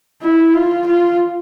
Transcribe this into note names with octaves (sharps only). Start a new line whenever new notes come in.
E4
F4
F4